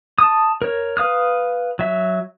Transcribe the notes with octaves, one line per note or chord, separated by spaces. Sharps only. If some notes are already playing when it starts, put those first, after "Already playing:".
A5 D#6
A#4 C#5
B4 F5 D#6 F6
F#3 E5